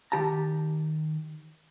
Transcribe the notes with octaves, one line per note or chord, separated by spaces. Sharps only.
D#3 G4 A5 A#5